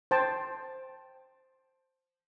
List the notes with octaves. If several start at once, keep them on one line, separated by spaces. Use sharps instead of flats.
C5 G5 A5